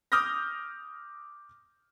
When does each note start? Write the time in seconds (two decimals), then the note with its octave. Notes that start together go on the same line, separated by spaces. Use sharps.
0.12 D6 D#6 F6 G6 A#6